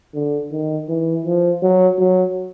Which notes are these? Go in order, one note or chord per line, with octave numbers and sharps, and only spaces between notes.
D3
D#3
E3
F3
F#3
F#3